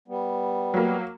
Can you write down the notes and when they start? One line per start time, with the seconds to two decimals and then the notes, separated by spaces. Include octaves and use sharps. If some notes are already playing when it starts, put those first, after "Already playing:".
0.08 G3 B3
0.74 F#3 A#3